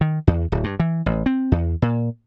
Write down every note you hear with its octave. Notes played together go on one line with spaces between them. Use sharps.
D#3
E2
D1
G2
E3
A1
C4
E2
A#2